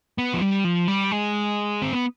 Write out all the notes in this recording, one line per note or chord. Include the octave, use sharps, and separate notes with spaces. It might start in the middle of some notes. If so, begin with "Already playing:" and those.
B3
F3
G3
F3
G3
G#3
C4
B3